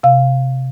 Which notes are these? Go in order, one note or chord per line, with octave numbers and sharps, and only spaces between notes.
C3 F5